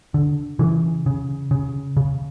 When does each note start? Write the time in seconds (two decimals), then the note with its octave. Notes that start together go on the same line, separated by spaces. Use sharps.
0.14 D3
0.59 C#3 E3
1.06 C#3
1.51 C#3
1.97 C#3